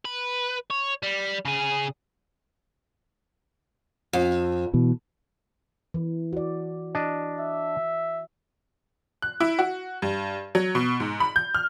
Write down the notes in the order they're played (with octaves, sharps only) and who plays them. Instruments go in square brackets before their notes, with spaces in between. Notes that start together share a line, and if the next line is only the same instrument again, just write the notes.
[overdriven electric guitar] B4
C#5
G3
C#3 G#4
[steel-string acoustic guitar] F2
[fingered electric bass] B2 E3
[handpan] E3
F#4 D5
[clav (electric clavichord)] D4 D#5
[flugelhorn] E5
[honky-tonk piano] F#6
E4
F#4
G2
F#3
B2
G#2
B5
G6
F6